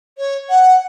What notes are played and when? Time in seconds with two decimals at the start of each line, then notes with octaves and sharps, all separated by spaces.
0.18 C#5
0.49 F#5